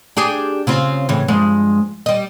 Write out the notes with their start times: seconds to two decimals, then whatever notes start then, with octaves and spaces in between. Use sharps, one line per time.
0.17 D4 G4 G#4
0.67 C#3 C4 F4
1.09 A2 C#3 E3
1.28 G2 F3 G#3
2.06 G3 D#5